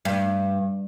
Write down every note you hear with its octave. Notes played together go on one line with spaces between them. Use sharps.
G2